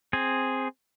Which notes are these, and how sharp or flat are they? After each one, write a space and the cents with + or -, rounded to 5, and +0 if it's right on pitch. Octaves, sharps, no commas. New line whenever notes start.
C4 +0 G#4 +0